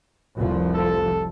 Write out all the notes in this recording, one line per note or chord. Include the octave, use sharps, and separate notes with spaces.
F1 C2 F3
A4